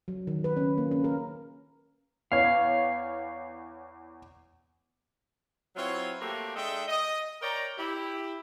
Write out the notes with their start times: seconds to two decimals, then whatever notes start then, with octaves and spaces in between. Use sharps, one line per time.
0.08 F#3
0.27 D#3
0.44 B4
0.57 C#4
0.78 A#3
0.91 C#4
1.04 A#4
2.32 E2 C#5 F5
5.76 F#3 C4 E4 F4 B4 C#5
6.20 A3 A#3 C4 F#4 G4
6.55 G#3 D4 A4 D#5 E5 G5
6.87 D#5
7.41 A#4 C#5 D5 G5 A#5
7.77 E4 G4